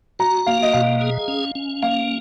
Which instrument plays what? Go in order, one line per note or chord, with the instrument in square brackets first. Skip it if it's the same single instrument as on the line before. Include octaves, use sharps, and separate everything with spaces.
[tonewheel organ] F#4 [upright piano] A#5
[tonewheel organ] A#3 [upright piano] F5
[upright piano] D#5
[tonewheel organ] B2 [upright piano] F5
[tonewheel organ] G#4
C#4
C#4
[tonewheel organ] A#3 [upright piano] F5